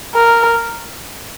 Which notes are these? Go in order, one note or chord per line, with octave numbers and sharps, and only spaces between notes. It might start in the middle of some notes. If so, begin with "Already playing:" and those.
A#4